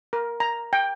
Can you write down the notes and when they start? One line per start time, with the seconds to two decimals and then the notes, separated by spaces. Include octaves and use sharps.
0.13 A#4
0.40 A#5
0.73 G5